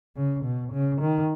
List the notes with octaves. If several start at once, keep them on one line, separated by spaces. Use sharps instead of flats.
C#3
B2
C#3
D#3